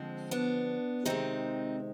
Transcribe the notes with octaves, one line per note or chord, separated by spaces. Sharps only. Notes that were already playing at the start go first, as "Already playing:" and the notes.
Already playing: D3 F3 G#3 C4
B3 D4
C3 D#3 G#3 C4 D#4